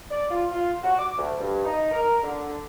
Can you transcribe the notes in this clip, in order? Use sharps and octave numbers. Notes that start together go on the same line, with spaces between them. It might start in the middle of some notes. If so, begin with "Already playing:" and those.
D5
F4
F4
F#4
D6
D2
G2
D#4
A#4
D3